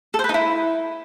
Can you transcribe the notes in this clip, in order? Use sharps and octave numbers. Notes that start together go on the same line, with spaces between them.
A4
C5
B4
D#4
E4